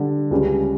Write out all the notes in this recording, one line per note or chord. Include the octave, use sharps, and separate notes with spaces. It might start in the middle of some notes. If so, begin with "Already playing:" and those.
Already playing: D3 G3 D4
C#2 C#3 G3 C#4